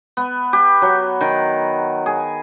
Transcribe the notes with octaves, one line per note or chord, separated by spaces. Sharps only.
B3
G4
F#3
D#3
G#4